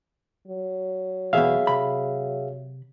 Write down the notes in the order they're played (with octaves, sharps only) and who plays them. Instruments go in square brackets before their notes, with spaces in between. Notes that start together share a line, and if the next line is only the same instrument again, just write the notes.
[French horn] F#3
[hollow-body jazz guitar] B1 E2 B2 [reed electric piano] G#4 E5 F5
[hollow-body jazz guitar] C3 B5